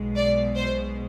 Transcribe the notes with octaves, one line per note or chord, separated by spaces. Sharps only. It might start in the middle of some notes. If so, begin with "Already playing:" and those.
Already playing: B1 B2 G#3
D5
C5